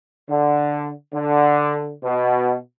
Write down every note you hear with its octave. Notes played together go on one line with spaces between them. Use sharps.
D3
D3
B2